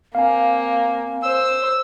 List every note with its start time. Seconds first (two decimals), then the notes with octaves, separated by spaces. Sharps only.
0.15 A#3 C4 F5 G#5
1.23 C5 E6